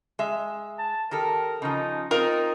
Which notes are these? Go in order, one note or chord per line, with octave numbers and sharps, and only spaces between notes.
G#3 E5
A5
D#3 G4 A4 A#4
C#3 F3 D#4
C4 D#4 F4 A#4